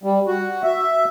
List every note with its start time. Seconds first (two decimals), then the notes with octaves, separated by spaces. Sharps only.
0.03 G3
0.27 F#4
0.63 E5